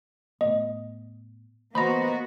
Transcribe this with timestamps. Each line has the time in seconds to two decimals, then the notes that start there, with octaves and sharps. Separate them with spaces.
0.41 A2 A3 B3 D#5
1.75 E3 A#3 B3 F#4 C5 D#5 A#5 B5